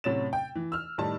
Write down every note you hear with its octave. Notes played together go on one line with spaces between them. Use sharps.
A2 C3 F#3 C#4 A6 E7
G5
E3
E6 F6
A2 D#3 G3 D#4 A5